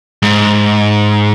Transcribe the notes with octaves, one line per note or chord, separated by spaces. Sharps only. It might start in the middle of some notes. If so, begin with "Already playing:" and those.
G#2